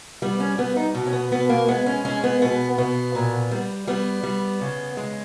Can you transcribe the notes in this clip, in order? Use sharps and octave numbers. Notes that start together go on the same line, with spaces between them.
G3 B3
C#4
G3 B3
D#4
B2
C#4
B3
B2 B3
A#3
G#3 B3
C#4
G#3 C#4
B3
B2 B3
B2 B3
A#2
G3
G3 B3
G3
C#3
G#3